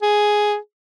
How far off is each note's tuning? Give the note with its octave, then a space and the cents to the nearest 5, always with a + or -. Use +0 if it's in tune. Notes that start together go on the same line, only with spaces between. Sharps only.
G#4 +5